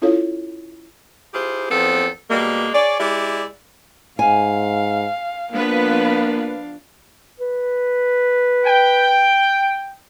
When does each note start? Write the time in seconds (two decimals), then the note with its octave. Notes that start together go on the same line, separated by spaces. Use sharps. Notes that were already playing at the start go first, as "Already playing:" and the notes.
0.02 C#4 E4 F4 A4 C#5 F5
1.34 E4 F4 G4 G#4 C5
1.70 E2 F3 B3 C4 A4
2.30 B2 G3 G#3 A#3
2.74 G#4 C#5 D5
3.00 G#3 E4 G4 D5
4.19 G#2 F5 G#5
5.52 F3 A#3 B3 D4 B4 F5
7.40 B4
8.65 G5